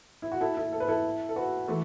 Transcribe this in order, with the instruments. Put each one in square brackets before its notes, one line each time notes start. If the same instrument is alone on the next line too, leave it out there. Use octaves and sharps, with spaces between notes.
[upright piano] E4
F#4
E4 A4
E4 A4
A4
B4
E4 A4
A4
F#4 B4
E3 A3